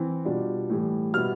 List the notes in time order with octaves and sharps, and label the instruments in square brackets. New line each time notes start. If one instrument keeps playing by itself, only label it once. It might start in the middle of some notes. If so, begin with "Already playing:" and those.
Already playing: [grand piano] E3 C4
B2 G3 D4 F4
A2 E3 G3
B2 G3 B3 E4 F6